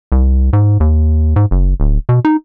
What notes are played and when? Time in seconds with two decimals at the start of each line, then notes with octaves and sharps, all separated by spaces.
0.12 C2
0.53 G#2
0.80 D#2
1.36 G#2
1.51 F#1
1.80 D1
2.09 B2
2.25 D#4